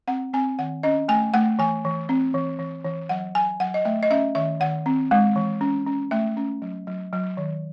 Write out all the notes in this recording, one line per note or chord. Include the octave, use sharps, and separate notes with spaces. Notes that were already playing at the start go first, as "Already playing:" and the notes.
C4 F#5
C4 G#5
D#3 F#5
C#4 D#5
A3 G#5
A3 F#5
E3 G#5
E3
C4
E3
E3
E3
F#3 F#5
F#3 G#5
F#3 F#5
D#5
A3 E5
D#5
C#4 E5
D#3 E5
D#3 F#5
C4
G#3
E3
C#4
C#4
A3 E5
C#4
F#3
F#3
F#3
D#3